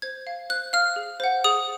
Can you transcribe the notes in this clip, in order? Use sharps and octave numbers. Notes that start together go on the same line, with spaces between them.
C5 G#6
F5
C5 F#6
F5 F6
G#4
C5 F#5
G#4 D#6